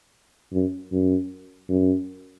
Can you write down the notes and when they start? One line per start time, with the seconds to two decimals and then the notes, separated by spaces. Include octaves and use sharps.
0.53 F#2
0.92 F#2
1.69 F#2